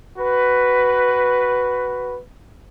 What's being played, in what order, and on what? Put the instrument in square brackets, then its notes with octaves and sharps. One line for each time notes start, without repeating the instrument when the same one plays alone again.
[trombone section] F#4 B4